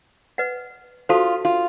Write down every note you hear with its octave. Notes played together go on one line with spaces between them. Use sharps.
B4 D#5 F#5
F4 F#4 A4 C5 F5 A5
F4